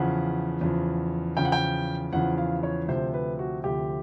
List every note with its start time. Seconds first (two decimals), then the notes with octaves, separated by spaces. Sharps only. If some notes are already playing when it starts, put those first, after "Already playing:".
Already playing: E2 C#3 F3 F#5
0.61 E2 C#3 F3
1.37 E2 C#3 F3 G5
1.45 F#5
1.52 G5
2.13 E2 C#3 F3 F#5
2.38 F5
2.63 C#5
2.88 D2 C3 F3 C5
3.14 B4
3.39 F#4
3.64 D2 C3 F3 G4